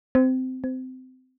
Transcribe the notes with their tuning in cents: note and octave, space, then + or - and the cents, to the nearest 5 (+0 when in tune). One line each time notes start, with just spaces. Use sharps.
C4 -20
C4 -25